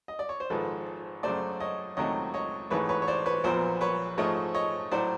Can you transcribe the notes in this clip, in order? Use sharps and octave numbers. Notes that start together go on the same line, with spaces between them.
D#5
D5
C#5
C5
G#1 G#2 F3 A4 B4
F#2 C#3 F#3 A3 C5 D5
C#5 D#5
C#2 C3 D#3 F#3 A3 C#5 D#5
C#5 D#5
A1 G#2 E3 A3 B4 C#5
B4 C#5
C#5
C5 D5
B4 C#5
A#1 A#2 F#3 B3 A#4 C5
B4 C#5
G#2 F3 A3 C#5 D#5
C#5 D#5
A2 F#3 C5 D5